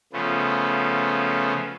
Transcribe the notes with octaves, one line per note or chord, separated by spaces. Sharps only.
C#3 F3 A3 B3